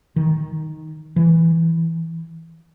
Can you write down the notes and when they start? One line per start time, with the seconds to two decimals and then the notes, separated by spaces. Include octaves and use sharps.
0.16 D#3
1.16 E3